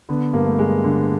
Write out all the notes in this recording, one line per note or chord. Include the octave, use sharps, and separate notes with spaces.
D3 B3
G2 A#3
A3
G2 G#3
D3